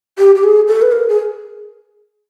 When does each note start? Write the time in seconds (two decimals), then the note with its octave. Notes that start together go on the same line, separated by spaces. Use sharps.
0.18 G4
0.35 G4
0.44 G#4
0.68 A4
0.82 B4
0.92 A#4
1.09 G#4